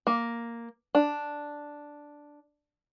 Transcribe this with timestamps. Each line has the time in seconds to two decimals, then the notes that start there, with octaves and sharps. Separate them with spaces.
0.07 A#3
0.95 D4